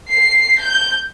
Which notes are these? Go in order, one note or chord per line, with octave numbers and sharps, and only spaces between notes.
C7
G6